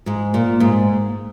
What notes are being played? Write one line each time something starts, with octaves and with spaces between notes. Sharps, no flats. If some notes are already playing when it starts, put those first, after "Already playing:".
G#2 G#3
A#2 A#3
G#2 G#3